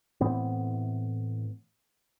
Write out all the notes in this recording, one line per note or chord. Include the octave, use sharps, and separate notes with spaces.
A2 E3 B3 C4